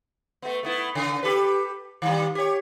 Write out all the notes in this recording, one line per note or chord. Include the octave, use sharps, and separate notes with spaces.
A3 B3
A3 B3 E4
C#3
G4 A4 B4
D#3 G3
G4 C#5